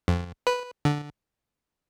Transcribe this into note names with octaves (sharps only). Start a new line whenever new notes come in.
F2
B4
D3